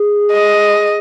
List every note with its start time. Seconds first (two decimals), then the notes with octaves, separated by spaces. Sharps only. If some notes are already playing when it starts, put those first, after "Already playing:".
Already playing: G#4
0.32 D#5